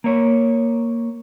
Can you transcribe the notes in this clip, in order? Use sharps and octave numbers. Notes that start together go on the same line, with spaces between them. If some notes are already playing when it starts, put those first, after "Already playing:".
A#3 C#5